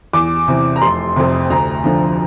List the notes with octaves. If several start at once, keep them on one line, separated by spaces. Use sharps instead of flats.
E2 D6
C3 E3
A#5
F1 C6
F2 C3
D2 A#5
D3 F3